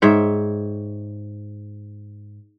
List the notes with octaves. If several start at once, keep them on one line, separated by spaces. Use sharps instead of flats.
G#2 C#5 E5 G5